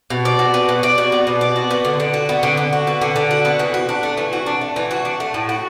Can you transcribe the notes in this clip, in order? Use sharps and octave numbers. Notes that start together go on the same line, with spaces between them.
B2
D5
F#4
B3
B2
D5
F#4
B3
B2
D5
F#4
B3
D3
D3
F#4
B3
D3
D3
F#4
B3
D3
D3
F#4
B3
E3
F#4
D4
A3
E3
F#4
D4
A3
E3
F#4
D4
A3
A2
F#4